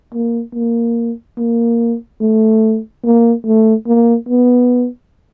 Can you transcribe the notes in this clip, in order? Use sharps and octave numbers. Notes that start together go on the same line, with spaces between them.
A#3
A#3
A#3
A3
A#3
A3
A#3
B3